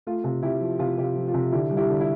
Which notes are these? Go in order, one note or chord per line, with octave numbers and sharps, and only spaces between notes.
A3 F4
C3 F4
C3 E4 G4
F3
C3 F4
C3 G4
F4
F3
F4
C3
D3 E4 G4
G3
E4 G4
D3
E4